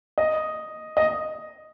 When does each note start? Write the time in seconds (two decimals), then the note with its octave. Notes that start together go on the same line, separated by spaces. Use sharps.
0.18 D#5
0.97 D#5